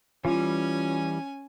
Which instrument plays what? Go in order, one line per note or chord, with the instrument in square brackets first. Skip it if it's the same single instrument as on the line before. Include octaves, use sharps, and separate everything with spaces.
[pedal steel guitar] E3 G3 [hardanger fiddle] C#4 G#5 [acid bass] F4